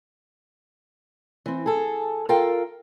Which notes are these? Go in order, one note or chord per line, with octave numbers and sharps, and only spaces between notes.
E3 C4
G#4 A4
F4 A4 A#4 F5 G5